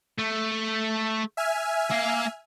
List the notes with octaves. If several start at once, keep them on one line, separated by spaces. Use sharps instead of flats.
A3
E5 G#5 F6
A#3 F5